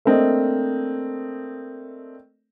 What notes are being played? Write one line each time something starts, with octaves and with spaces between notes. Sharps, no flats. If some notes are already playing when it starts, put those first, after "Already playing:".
A3 A#3 C4 D4 D#5